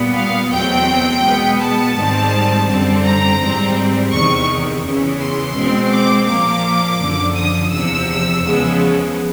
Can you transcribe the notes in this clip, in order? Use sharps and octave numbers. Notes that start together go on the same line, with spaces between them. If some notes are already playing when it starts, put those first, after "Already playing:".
Already playing: A#2 G3 B3
F5
E2 B2 F#3 A3 C4 G5
B2 G#3 B3
A5
G#2 D#3 G3 C4
F#2 D3 G3 C4
A#5
G#2 E3 G3 C4
E2 C3 D#3 C#6
E2 C#3 E3
C6
B2 G#3 C4
D6
A#2 F3 A#3 D6
F#2 D3 F3
D#6
E2 C3 F3 E6
E2 C#3 F3 G#3 B3